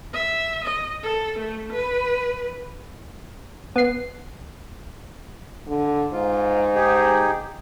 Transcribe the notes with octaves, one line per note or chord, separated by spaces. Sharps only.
E5
D#5
A4
A3
B4
B3 C7
D3
G#2 F4
D#4 G4 G#4